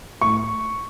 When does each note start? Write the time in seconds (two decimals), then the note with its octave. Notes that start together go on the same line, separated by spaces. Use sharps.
0.21 A2 C#6